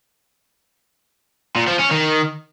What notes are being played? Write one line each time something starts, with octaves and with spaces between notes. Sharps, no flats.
A#2
F3
C#4
D#3